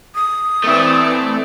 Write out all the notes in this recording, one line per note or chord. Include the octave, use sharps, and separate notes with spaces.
D#6
E3 A3 C4 D5 E5